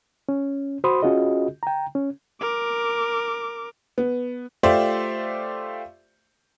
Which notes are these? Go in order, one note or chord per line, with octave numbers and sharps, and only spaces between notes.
C#4
F#4 C5 B5 C6 D#6
C#4 F4 F#4 G#4 D#5
G5 A#5
C#4
A#4 D6
B3
A3 F4 G4 C5 D5 E5